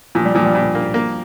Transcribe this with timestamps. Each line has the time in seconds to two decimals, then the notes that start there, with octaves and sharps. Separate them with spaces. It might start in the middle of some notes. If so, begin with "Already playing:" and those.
0.15 A#2 F3
0.25 G3
0.35 A#2 F3
0.45 G3
0.55 A#2
0.75 A#3
0.94 A#3